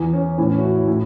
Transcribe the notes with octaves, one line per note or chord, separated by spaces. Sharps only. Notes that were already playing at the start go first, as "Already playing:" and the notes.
Already playing: E2 E3
C#4
A2 E3 C#4
C#4
F#4
E4
E4
A2